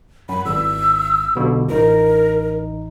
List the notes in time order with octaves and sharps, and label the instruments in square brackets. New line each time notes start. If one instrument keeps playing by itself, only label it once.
[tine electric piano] F#2 [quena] B5
[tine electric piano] G#1 [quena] E6
[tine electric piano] B1 B2 D3
[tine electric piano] A1 D#4 [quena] A#4